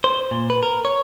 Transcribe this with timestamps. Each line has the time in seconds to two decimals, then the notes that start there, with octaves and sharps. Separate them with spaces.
0.04 C5
0.31 A#2
0.50 B4
0.63 A#4
0.85 C#5